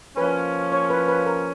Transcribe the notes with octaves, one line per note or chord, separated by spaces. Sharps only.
F3 A#3 C#4 B4
C#5
B4
B4
A#4